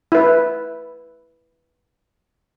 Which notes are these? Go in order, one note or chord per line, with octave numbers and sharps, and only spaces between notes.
E4 B4